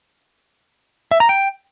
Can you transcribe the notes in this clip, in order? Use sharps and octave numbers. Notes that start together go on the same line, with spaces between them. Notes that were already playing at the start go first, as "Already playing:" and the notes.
E5
A#5
G5